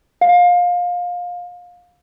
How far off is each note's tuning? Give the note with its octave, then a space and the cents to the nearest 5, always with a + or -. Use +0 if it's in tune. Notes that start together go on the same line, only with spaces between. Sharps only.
F5 +25